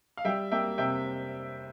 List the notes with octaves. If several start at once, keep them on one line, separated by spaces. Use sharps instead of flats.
F5
G3 E5 G5
A#3 E5 G5
C3 E5 G5